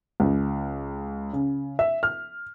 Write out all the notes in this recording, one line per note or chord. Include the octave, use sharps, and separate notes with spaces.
C#2
C#3
E5
F6